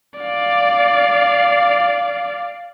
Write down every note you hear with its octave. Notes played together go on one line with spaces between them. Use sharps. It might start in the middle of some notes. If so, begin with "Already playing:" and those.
D5 F5